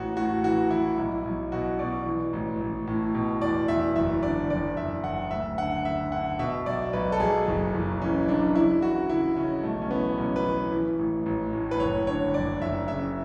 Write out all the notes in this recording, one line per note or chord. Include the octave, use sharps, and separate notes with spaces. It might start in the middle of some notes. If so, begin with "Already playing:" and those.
Already playing: A1 F#4
A2 F#4
E3 F#4
E3 E4
B1 E4
B1
B2 F#4
B2 D5
E3
A1
A1
A2
B2
E2 D5
E2 E5
F#1 E5
D3 D5
F#1 D5
F#1 E5
F#1 F#5
D2 E5
D3 F#5
D3 E5
D3 F#5
B2 E5
B1 D5
B1 B4
A4
B1 G#4
F#1
F#1
E3 C#4
F#2 D4
C#3 E4
E3 F#4
C#3 E4
C#3 C#4
B1 A3
C#4
E3 B3
B1 C#4
B4
E3
E3
A1
A1
A2
B4
F#1 C#5
D3 C#5
F#1 D5
F#1 E5
C#3 E5